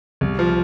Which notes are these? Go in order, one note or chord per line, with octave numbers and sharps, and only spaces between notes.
C2
F3